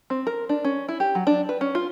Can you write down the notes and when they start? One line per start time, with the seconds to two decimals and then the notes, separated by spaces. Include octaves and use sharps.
0.10 C4
0.27 A#4
0.49 D4
0.64 C#4
0.89 E4
1.00 G4
1.15 F#3
1.27 D4
1.49 B4
1.61 C#4
1.75 F4